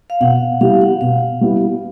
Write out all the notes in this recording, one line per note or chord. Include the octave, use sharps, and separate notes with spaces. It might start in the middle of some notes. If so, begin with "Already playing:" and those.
F5
B2 F#5
G3 B3 E4 G4 F5
F#5
B2 F5
G3 B3 E4 G4